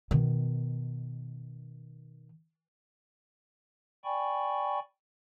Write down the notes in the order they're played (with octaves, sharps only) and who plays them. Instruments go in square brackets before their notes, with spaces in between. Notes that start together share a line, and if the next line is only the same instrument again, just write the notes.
[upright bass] B2 D#3
[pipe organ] D5 G5 G#5 B5 C#6